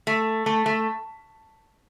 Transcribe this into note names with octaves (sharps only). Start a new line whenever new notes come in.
A3
A3
A3